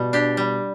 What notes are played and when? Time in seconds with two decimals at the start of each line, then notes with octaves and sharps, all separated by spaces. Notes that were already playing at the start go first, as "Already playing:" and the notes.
Already playing: B2 G3
0.13 D4 G4
0.37 G3